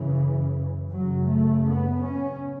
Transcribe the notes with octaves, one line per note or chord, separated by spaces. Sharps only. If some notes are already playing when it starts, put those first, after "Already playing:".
Already playing: F#2 C#3 E3
F#2 C#3 F#3
A3
B3
C#4